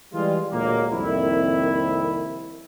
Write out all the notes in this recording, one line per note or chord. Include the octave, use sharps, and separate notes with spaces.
E3 G3 G#3 F4
D2 A#2 F3 F#3 G#3 A#3
C2 F2 D#3 A#3 E4